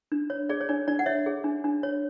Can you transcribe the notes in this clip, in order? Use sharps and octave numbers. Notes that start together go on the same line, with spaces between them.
D4
C#5
G#4 D5
C#5
D4 D5
D4 D5
F#5
C#5 E5
G#4
D4
D4
C#5